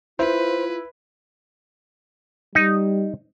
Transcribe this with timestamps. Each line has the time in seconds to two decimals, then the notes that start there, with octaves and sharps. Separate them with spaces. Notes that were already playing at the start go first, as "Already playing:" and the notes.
0.19 E4 F4 B4 C5
2.55 G3 D#4